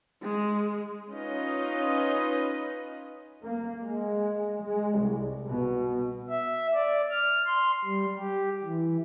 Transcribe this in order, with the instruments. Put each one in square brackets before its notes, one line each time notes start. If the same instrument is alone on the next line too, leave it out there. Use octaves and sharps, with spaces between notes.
[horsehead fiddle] G#3
[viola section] C#4 D#4 F4 B4 D#5
[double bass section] A#3
G#3
G#3
C2
B2
[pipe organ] E5
D5
F6
C6
G3
G4
E3